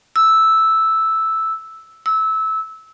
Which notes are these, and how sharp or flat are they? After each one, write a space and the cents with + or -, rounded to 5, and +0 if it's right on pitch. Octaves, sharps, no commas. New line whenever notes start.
E6 -5
E6 -20